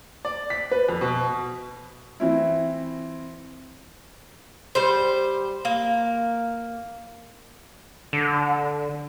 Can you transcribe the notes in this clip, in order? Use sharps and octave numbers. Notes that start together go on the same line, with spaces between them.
D5
B6
B4
F2
B2
E3 C4 E4
G3 C5
A#3
D3